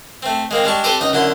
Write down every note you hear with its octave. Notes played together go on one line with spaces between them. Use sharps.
A3 C4
G#3 A#3 C4
G3 G#3 D4 C#6
C4 G4 A4 B4 C5 D5
C#2 D#4 D#5
F#2 D3 E4 C6